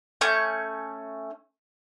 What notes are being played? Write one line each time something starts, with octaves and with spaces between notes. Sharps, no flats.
A3 C#4 C#6 G6